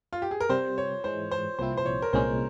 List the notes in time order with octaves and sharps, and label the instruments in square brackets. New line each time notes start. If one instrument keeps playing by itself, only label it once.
[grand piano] F4
G4
G#4
A#4
[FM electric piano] C3 G3 C4 [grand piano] C5
[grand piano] C#5
[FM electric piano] G#2 E3 G#3 [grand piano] C5
[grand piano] C5
[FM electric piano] C2 A#2 F3 C4 E4 [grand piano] C5
[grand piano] C5
C#5
A#4
[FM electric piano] C2 A#2 G#3 C#4 [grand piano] C5